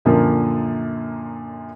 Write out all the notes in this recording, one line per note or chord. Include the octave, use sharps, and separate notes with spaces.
F#2 A#2 D3 F3 A#3